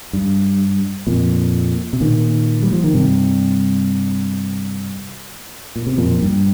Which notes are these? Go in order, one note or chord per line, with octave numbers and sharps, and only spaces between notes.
G2
F2 A#2
C3
A#2 D#3
G3
F3
D#3
G2 C3
A#2
C3
F2 A#2
G2